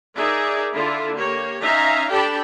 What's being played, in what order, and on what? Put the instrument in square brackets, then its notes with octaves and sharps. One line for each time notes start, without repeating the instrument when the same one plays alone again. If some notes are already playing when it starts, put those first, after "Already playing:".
[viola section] D#4 G#4 A#4 D5 E5
D3 E4 F4
A#3 G4 C#5
C#4 D#4 E5 F5 A#5
D4 G4 A4 G5 A5 B5